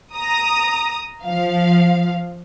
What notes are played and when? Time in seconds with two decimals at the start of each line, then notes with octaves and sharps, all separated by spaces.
0.14 A#5 D#6
1.25 F3 F5